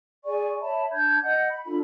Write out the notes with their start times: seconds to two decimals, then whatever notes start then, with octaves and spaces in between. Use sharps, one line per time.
0.24 G#4 D5 G#5 C#6
0.61 C#5 E5 A5 B5
0.92 D4 A5 G6 G#6
1.23 D#5 F#5 G6
1.50 B5
1.66 D4 F4 A4 B5